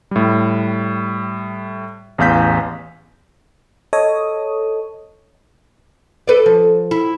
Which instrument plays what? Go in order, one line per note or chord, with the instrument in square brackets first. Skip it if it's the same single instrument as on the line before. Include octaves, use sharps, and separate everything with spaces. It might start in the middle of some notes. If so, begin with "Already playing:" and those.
[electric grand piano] A2 G3
A1 E2 F5 G6 B6
[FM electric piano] A4 C#5 D#5 D#6
[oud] A4 B4 D5
F3
E4